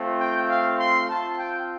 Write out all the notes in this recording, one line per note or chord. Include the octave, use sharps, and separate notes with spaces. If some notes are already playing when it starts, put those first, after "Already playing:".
Already playing: A3 C4 F4
G5
F5
C6
C4 F4 A5
G5